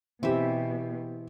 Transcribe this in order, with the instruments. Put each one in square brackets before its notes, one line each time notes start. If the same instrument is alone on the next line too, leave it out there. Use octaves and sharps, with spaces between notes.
[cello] B2 [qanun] E3 E5 [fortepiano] C4 G4